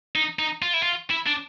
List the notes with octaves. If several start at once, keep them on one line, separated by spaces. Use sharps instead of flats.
D#4
D#4
F4
E4
F4
E4
D4